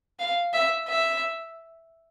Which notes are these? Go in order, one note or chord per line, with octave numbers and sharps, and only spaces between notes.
F5
E5
E5